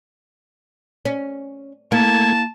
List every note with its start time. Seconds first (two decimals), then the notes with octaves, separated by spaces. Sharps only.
1.05 C#4
1.92 A3 A#3 E4 A5 G#6